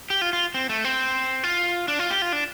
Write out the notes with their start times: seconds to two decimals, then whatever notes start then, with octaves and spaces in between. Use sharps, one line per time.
0.10 G4
0.21 F4
0.33 F4
0.54 C4
0.69 A3
0.84 C4
1.44 F4
1.88 D4
1.99 F4
2.10 G4
2.22 F4
2.32 D4